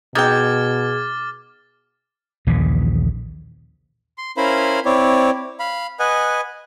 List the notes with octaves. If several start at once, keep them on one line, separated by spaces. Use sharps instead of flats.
B2 D#4 G#4 G5 D6 F6 G#6 A6
A#1 D#2 C#3 E3
C6
C#4 E4 A#4 C5 F5 B5
C4 E4 C#5 D5
F5 B5
B4 D#5 F#5 G#5